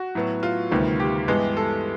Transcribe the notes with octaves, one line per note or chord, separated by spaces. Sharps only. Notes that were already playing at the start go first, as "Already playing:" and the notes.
Already playing: F#4
A2 F#3 B3
F4
D2 C3 D#3 G3 B3
G4
G2 E3 G#3 B3
A4